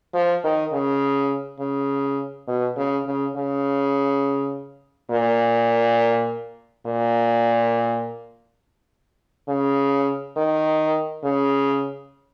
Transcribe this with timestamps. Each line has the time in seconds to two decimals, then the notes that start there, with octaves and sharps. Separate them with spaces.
0.14 F3
0.44 D#3
0.73 C#3
1.60 C#3
2.48 B2
2.77 C#3
3.06 C#3
3.36 C#3
5.11 A#2
6.86 A#2
9.48 C#3
10.37 D#3
11.24 C#3